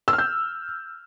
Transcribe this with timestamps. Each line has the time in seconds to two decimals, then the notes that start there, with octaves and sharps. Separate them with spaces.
0.08 E6
0.13 F6
0.18 G6